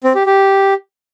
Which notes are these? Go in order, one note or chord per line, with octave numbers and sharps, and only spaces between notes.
C4
G4
G4